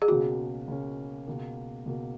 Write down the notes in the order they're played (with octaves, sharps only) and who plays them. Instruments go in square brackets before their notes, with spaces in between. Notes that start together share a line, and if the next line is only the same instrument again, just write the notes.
[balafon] G#4
[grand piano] C#2 B2 A#3 C#4 [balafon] F#4
[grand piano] C#2 B2 A#3 C#4
C#2 B2 A#3
C#2 B2 A#3